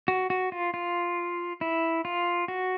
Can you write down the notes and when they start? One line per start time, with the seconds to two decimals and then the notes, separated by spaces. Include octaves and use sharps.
0.08 F#4
0.30 F#4
0.52 F4
0.74 F4
1.61 E4
2.05 F4
2.48 F#4